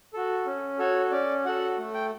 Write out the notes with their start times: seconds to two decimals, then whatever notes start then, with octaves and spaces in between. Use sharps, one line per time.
0.14 F#4 A4
0.46 C#4
0.79 F#4 A4 C#5
1.11 C#4 D5
1.45 F#4 A4 F#5
1.78 A3
1.94 G5